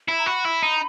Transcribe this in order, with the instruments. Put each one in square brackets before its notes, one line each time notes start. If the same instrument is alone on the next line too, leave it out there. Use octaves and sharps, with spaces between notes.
[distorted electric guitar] E4
[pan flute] A#5
[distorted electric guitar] F#4 [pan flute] B5
[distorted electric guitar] E4
D#4